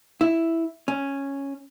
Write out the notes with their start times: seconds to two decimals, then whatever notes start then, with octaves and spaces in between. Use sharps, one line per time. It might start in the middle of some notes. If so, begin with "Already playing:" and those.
0.21 E4
0.88 C#4